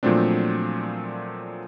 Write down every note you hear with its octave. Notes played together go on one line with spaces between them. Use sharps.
A#2 F3 F#3 A3 C4 D4